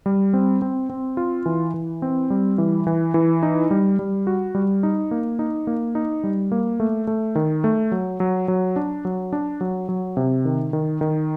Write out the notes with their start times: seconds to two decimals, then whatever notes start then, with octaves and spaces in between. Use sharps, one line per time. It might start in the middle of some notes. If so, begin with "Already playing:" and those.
0.06 G3
0.33 C4
0.62 C4
0.90 C4
1.17 F4
1.46 E3
1.74 E3
2.02 C4
2.30 G3
2.58 E3
2.87 E3
3.14 E3
3.43 D#4
3.71 G3
3.99 G3
4.27 F#4
4.55 G3
4.83 D#4
5.11 A#3
5.39 D#4
5.67 A#3
5.95 D#4
6.24 G3
6.52 A#3
6.80 A3
7.07 A3
7.35 D#3
7.64 A3
7.92 F#3
8.20 F#3
8.48 F#3
8.76 D4
9.05 F#3
9.33 D4
9.61 F#3
9.89 F#3
10.17 C3
10.45 D#3
10.73 D#3
11.01 D#3